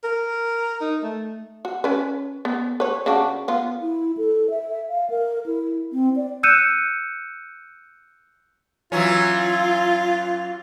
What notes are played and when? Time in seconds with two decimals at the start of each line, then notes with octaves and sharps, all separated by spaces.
0.04 A#4
0.81 D#4
1.03 A3
1.65 F#4
1.84 C#4 B4
2.45 B3
2.80 B4 C#5
3.06 C#3 D4 F#4
3.48 B3 F4
3.81 E4
4.17 A4
4.50 E5
4.89 F5
5.10 A#4
5.46 E4
5.93 C4
6.16 D5
6.43 E6 F#6 G6 C#7 D#7 E7
8.92 E3 F#3 C#4 F4